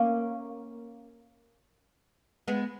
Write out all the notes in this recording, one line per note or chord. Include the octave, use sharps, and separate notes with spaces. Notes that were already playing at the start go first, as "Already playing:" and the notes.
Already playing: A#3 C#4
G#3 B3